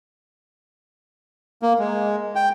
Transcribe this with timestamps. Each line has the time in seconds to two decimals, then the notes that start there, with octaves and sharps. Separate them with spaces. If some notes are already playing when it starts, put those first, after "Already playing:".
1.62 A#3
1.79 G#3
2.35 G5